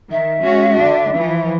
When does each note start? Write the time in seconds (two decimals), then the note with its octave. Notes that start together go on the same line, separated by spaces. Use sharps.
0.11 D#3 E5
0.42 G#3 C#4 F#4
0.79 D3 D4
1.15 E3 F3